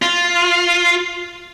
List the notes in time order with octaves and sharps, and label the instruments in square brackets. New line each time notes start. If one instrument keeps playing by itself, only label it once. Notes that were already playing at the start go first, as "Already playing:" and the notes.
[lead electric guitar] F4